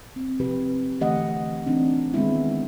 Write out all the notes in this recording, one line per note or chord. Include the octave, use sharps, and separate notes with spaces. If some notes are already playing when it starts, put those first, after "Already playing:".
C4
C3 F3 C4 E4 G4 B4
D3 E3 A3 G4 D#5 F#5
E3 C4 D4 D#4
D#3 G#3 B3 C4 E4